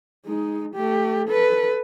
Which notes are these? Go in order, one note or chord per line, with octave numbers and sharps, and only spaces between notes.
G#3 D#4
A3 G4
A4 B4